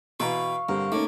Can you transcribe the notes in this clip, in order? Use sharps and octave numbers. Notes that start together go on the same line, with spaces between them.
B2 E3 B4 F5 G5 A#5 C#6
G2 D3 C4 A#4
A3 A#3 C#4 D#4 D6